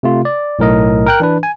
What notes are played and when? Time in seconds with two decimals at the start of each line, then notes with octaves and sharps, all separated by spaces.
0.03 C3 A3 F4
0.25 D5
0.59 B1 A2 A#4 D#5
1.06 A#4 G5 F#6
1.20 E3 D4 B4
1.43 G#5